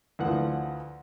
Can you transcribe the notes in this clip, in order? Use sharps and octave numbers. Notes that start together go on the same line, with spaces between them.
D2 E3 F3 F#5